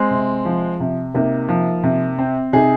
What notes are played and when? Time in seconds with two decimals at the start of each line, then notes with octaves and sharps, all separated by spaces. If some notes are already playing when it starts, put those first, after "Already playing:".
Already playing: G#3 C4
0.11 C3
0.45 F3
0.80 C3
1.14 C3 A#3 D#4
1.49 F3
1.83 C3
2.18 C4
2.53 C3 D#4 G#4